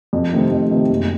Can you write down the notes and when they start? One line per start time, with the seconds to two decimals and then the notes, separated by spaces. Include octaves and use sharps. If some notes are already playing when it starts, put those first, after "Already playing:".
0.13 F2
0.33 C3 D#3 A3 C4
0.51 F2
0.71 C3 D#3 A3 C4
0.90 F#1